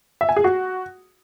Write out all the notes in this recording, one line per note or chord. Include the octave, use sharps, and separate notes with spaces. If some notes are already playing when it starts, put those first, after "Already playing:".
E5
G#5
G#4
F#4